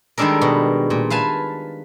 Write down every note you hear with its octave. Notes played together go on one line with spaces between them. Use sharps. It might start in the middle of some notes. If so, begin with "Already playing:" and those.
D#3 G3 G#3 D4 A4 A#4
B2
A#2
B4 F5 G#5 A5